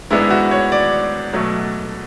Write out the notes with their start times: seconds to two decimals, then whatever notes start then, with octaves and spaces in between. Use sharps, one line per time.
0.10 G#2 G#3 B3 D4 E4
0.30 F#4
0.51 C#5
0.72 D5
1.33 B2 F#3 A3